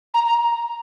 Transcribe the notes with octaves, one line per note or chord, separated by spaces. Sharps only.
A#5
A#5